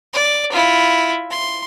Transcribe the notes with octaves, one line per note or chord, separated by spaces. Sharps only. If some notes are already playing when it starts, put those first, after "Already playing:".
D5
E4 F4
C6